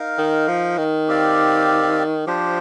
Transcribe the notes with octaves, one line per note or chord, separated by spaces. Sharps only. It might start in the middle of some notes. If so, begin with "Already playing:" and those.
Already playing: D#4 A#4 F5
D#3
F3
D#3
C4 G4 D5 F5
F3 D4 G4 C5